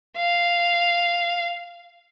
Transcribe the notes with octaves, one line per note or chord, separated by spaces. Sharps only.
F5